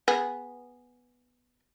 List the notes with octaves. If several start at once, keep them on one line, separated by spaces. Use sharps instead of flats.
B3 G#4